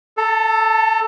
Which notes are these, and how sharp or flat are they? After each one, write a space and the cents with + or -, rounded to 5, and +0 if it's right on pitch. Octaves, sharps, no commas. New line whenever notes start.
A4 +0 A5 +45